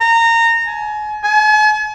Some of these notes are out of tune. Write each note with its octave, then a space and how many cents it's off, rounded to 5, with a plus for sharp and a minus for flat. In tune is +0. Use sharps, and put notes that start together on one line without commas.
A#5 -20
G#5 +35
G#5 +45